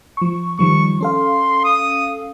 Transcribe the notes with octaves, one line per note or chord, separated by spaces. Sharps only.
F3 C#6
D#3 F3 G3 C#6
C#4 A4 F5 C6
D#6